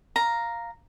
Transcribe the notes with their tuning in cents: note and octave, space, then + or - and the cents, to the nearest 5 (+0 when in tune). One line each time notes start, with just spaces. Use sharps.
F5 +0 A#5 +0